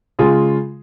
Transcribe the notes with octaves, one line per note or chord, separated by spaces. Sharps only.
C#3 G#3 F4 G#4